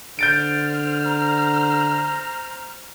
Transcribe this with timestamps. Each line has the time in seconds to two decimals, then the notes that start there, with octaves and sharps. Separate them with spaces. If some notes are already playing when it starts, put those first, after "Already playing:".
0.19 D3 C5 F6 G6 A6 D7
1.06 A#5